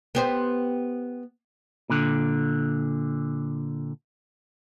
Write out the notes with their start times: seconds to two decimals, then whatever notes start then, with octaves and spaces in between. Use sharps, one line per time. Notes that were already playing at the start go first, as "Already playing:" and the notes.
0.15 B3 G4 C5
1.90 A#2 D3